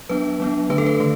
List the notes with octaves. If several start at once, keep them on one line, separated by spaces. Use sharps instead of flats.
F#3 B3 D4 B4
F#3 B3 D4
D3 A3 D4 B4
A4
B4
D3 A3